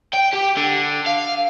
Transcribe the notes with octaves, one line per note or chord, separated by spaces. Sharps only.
G5
G4
D3
F5